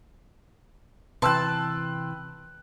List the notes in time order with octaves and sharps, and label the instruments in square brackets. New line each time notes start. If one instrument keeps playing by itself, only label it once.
[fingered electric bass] C3 E3 [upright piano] B4 G5 [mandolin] A5 [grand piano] C6 E6 F#6